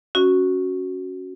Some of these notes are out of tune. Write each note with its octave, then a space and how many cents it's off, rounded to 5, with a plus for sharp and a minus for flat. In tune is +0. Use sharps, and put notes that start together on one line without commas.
C#4 +0 F#4 +0